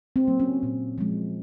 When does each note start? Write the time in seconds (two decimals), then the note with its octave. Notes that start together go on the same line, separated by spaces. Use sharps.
0.16 C4
0.28 F#3 A#3
0.40 C#4
0.63 A#2
0.98 F3 G#3